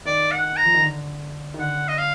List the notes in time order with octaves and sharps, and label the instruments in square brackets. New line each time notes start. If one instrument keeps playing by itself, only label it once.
[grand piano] D#3 [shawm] D5
[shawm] F#5
A#5
[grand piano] F3
D#3
D3
D#3
[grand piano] D3 [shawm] F#5
[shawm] D#5
F5